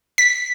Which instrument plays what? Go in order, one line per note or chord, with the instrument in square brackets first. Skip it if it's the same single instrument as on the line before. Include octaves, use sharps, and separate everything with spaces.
[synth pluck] B6